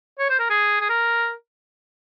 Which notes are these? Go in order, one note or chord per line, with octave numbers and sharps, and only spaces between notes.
C#5
C5
A#4
G#4
G#4
A#4